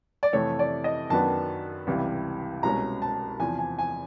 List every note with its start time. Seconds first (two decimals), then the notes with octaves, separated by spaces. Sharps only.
0.23 D5
0.33 F2 C3 E3 A3 C#5
0.59 D5
0.84 D#5
1.10 F#2 D#3 F#3 B3 D4 A5
1.87 C#2 C3 E3 G3
2.63 C2 B2 G#3 C#4 A#5
3.02 A5
3.40 E2 C3 F3 G#5
3.59 G#5
3.79 G#5